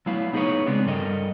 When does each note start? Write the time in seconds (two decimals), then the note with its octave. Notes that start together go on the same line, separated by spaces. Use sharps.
0.06 F#3 A3 B3 E4 F5
0.33 B3 D#4 G#4 A#4 B4 C#5
0.67 C#3 G#3 B3 C4 D4
0.87 G2 G3 A4 A#4 D#5